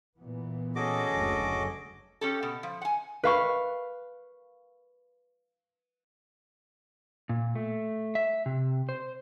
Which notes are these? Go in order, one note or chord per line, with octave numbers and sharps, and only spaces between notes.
A#2 E3 B3
C#4 F#4 G#4 A4 D#5 D6
F#1 D2 F#3
C#4 G4 A4
B2
F3
F#5 G#5
B4 F5 C#6
A#2
A3
E5
C3
C5